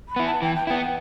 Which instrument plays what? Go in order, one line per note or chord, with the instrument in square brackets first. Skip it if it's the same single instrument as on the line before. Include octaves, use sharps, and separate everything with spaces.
[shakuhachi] B5
[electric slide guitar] B3 E4
[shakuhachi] A5
[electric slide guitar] E3 [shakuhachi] G5
[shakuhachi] G5
[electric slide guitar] B3 E4 [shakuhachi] G5
[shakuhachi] G5